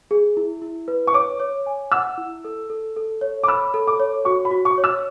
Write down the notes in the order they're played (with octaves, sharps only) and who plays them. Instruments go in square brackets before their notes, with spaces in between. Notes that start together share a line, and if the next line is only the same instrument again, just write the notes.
[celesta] G#4
E4
E4
B4
[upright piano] C#6
[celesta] C#5 [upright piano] D6
[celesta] C#5
G#5
[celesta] F#5 [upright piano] E6
[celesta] E4
A4
A4
A4
C#5
[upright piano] D6
[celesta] B5 [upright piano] E6
[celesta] A4
[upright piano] D6
[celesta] C#5
[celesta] F#4 [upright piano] C#6
[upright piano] B5
[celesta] F#4
[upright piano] C#6
[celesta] C#5
[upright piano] E6